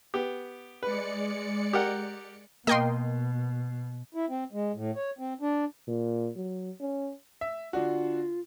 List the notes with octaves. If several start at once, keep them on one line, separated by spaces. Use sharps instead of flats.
B3 G4
G#3 B4 D5 C#7
G4 A#4 F#5
B2 A#3 A#4 D#5 G5 C6
E4
C4
G#3
A2
C#5
C4
D4
A#2
F#3
C#4
E5
D3 D4 F4 F#4